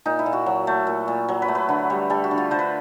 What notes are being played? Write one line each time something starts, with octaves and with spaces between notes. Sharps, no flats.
A#2 D#4
E4
A#2
F#4
F#3
A3
A#2
A#2
F#3
B4
A3
B4
D3
G3
G3 A4
F#4
D3
F4
D3 C5
B4